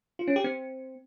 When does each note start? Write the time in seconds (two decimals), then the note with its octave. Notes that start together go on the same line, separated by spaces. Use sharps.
0.19 F4
0.28 C#4
0.36 G4
0.44 C4